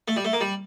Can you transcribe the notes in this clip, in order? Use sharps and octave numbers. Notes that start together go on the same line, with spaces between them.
A3
G3
A3
A#3
G3